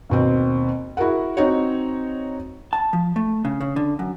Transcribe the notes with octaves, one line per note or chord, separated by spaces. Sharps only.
D#2 B2 C4
E4 F#4 G#4 A#4 F#5
C4 D#4 F#4 C#5
A5
F3
A3
C#3
C#3
D3
F#2